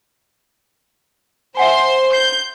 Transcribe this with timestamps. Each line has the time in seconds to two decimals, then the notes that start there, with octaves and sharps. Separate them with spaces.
1.57 C5 E5 F#5 G#5 C6
2.13 G6 C7